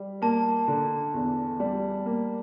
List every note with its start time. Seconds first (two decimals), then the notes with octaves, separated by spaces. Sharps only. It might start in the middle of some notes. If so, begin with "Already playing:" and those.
Already playing: G3
0.22 A#3 A5
0.68 D3
1.14 E2
1.60 G3
2.06 A#3